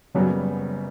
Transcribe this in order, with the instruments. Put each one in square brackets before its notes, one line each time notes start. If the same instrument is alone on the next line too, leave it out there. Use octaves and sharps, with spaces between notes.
[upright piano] F#1 F#2 C#3 G3 B3 [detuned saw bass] F#3